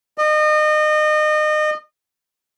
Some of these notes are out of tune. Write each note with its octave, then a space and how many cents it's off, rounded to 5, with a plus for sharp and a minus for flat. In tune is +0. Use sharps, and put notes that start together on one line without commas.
D#5 -30